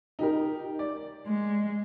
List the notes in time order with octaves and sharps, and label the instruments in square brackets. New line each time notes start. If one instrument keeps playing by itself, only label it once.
[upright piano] D#4 G4 A#4
D5
[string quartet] G#3